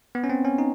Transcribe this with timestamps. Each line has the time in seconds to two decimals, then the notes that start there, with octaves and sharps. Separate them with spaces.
0.15 B3
0.24 C#4
0.29 C4
0.45 C#4
0.58 D#4